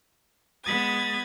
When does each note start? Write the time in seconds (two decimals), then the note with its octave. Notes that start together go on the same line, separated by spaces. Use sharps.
0.64 G#3 B3 B5 D#6 G#6 A6